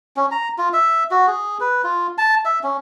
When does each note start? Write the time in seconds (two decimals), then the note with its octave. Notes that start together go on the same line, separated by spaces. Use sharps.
0.17 C#4
0.31 A#5
0.58 F4
0.73 E5
1.11 F#4
1.27 G#4
1.61 B4
1.84 F4
2.18 A5
2.45 E5
2.63 C#4